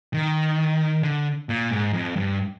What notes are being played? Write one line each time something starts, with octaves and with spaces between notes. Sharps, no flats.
D#3
D3
A#2
G#2
F2
G2